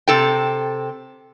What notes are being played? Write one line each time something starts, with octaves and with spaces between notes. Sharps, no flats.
C3 A4 G5